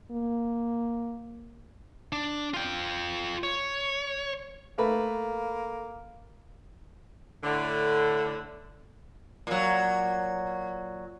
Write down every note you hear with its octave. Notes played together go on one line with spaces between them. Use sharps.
A#3
D4
F4 G5
C#5
A3 A#3 B4 B5
A2 D3
A#2 F#3